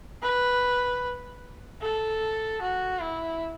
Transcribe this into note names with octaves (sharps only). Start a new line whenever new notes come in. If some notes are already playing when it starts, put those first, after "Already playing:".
B4
A4
F#4
E4